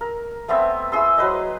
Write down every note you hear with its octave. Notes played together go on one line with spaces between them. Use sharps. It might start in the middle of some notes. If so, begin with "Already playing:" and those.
A#4
A3 B3 C4 E5
E4 G#4 C6 E6
F#3 B4 C5 D#5